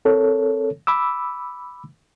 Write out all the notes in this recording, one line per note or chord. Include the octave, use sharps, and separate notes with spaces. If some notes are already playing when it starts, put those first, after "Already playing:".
C4 A4 A#4 C#5
B5 D6 E6